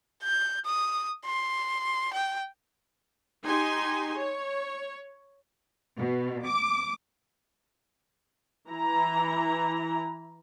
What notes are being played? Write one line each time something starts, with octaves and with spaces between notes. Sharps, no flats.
G6
D#6
C6
G5
D#4 G4 G#5 C6
C#5
B2
D6
E3 E4 A#5